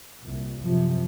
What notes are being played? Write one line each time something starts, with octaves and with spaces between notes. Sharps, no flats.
C2 A#2
F#2 C3 F3